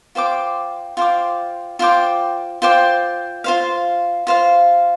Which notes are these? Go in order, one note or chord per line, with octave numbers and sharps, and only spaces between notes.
F4 C5 G5 D6
F4 C5 G5 D6
F4 C5 G5 D6
F4 C5 G5 D6
F4 C5 F5
F4 C5 F5